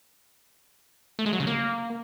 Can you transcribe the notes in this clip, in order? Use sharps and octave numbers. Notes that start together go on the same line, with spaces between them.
A3
G#3
F#3
C#3
A#3